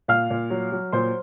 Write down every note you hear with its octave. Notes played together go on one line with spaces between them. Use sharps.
A#2 F5 F6
A#2
F#3
F#3
A#2 C5 C6